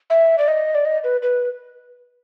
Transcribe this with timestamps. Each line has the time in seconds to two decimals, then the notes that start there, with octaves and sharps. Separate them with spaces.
0.10 E5
0.38 D5
0.48 D#5
0.75 D5
0.85 D#5
1.04 B4
1.22 B4